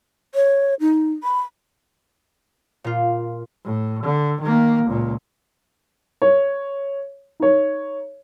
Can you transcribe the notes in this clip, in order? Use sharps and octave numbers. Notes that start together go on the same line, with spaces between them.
C#5
D#4
B5
A#2 F4
A2
D3
D#3 A#3
C#2 A#2
C#5
D#4 C#5